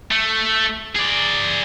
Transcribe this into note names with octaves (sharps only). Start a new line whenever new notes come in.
A3
G#4 D5